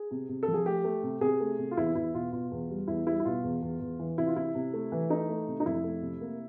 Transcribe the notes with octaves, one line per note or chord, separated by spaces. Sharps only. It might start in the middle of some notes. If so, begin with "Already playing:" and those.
Already playing: G#4
C3
C3
A4
F3
G#4
A3 G4
A3
C3
C3 G#4
A3
C3
F4
E2 E4
E2 E4
B2 F4
B2 F4
E2
G3
E2 E4
G3 E4
E4
B2 F4
E2
E2
E2
E3
C3 E4
F4
C3 E4
C3
A3
E3
A3 D#4
A3
C3
D#4
F2 E4
A3
C3
A#3